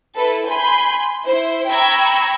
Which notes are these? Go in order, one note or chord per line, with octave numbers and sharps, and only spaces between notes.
E4 A4 B4
G#5 B5 C6 G6
E4 C5
G5 A#5 B5 C#6 E6 G#6